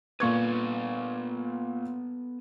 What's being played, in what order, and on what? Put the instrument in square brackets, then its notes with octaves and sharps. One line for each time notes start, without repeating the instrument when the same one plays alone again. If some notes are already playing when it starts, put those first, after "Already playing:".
[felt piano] A#2 C#6 G#6 [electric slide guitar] B3 A4 B4